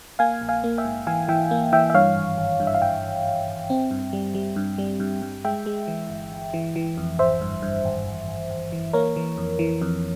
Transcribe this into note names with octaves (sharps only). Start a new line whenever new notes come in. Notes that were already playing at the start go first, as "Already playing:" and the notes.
A#3 F5 G#5
A#1
F5 G#5
A#3
E5 G5
G#2
E3 F5 G#5
E3 E5 G5
A#3
E3 E5 G5
E5
G2 C#5 F5
G#1
G#1
G2
E5
F5
G#1 E5 G5
G#1
G#1
G#1
C4
G2
G3
G3
G2
G3
G2
G2
G#3 E5 G5
G#3
E3
G1
G1
E3
E3
F2
G#1 C5 E5
G2
G2
G#1
G#1
G#1
G#1
E3
A#3 A#4 C#5
E3
F2
E3
F2